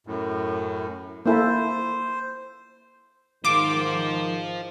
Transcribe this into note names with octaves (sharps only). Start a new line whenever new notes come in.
F#2 A2
A#3 E4 A4 C5
G#2 D#3 F4 C5 D6